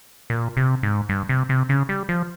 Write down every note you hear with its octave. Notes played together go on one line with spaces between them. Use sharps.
A#2
C3
G#2
G2
C3
C3
C#3
G3
F3